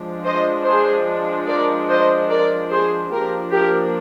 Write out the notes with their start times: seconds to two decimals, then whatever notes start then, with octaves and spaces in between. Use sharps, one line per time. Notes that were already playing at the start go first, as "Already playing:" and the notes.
Already playing: F3 G#3 D4
0.25 C5 D#5
0.65 G#4 C5
1.47 A#4 D5
1.88 C5 D#5
2.29 A#4 D5
2.70 G#4 C5
3.11 F3 A#3 D4 G4 A#4
3.53 G4 A#4